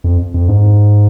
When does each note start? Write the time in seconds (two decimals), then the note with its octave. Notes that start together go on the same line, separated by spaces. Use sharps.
0.04 F2
0.34 F2
0.49 G#2